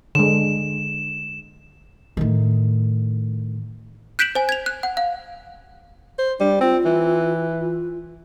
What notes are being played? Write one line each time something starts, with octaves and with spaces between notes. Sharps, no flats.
D3 G#3 E7
A2 D#3
F#6 G6 B6 D7 E7 F#7
C5 G#5
G#6 F7
F#6
F#5
F5
C5
G3 D4
C4 F4
E3
F4